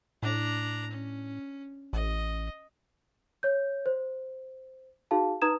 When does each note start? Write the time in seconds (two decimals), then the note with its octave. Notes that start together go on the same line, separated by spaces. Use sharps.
0.23 A2 D4 A#5
0.91 C#4
1.93 A1 D#5
3.43 C#5 G6
3.86 C5
5.11 D#4 F#4 G#4 F5 A5
5.42 D#4 B4 A#5 D#6 G#6 E7